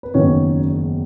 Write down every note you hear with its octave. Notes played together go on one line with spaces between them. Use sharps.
B4
F#1 E2 D#3 F#3 C#4 C#5